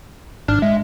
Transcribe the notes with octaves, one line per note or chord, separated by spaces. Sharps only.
G#1 G#2 D4 F6
G#3 E5